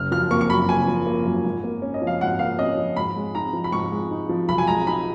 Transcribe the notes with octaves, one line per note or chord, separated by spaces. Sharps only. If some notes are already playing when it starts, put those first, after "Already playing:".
Already playing: F#1 F6
F3 F6
A#3 C#6
C#6
F#2 B5
F#1 G#5
F3
A#3
F#2
G#2
A#3
C#4
D#5
F3
F5
G#2 F#5
A#3 F5
C#4 D#5
F3
G#2 B5
G#3
D#4 A#5
F3
B5
G#2 C#6
G#3
D#4
F3
B1 B5
G#5
G#3 A#5
D#4 B5